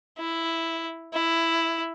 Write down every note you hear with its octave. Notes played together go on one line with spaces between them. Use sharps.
E4
E4